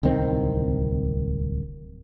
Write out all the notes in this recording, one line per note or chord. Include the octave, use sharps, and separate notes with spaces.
D1 C2 D#3 C4